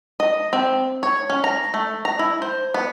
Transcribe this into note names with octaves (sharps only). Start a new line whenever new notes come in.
D#5
C4
C#5
C#4
A#5
A3
A#5
E4
C5
B3